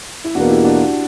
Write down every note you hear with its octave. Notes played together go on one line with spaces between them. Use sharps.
E4
E2 B2 A#3 D4 F#4
E4 G4
D4 F#4